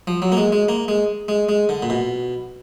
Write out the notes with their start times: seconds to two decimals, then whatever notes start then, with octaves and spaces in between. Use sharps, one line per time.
0.07 F3
0.22 F#3
0.32 A#3
0.37 G#3
0.52 G#3
0.69 A#3
0.88 G#3
1.28 G#3
1.49 G#3
1.69 D3
1.83 A#2
1.90 B2